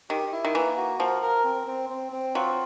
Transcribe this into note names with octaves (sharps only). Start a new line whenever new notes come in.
D#3 G4
E4
D#3
E3 A#3
F#4
F3 A#4
A#4
C4
C4
C4
C4
F#3 F4